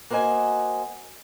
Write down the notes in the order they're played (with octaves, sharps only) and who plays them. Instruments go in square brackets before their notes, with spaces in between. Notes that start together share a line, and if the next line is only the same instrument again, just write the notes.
[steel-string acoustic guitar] A#3 F#4 C5 D#5 G#5